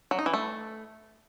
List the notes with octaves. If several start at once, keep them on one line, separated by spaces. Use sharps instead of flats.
F#3
D#4
E3
A3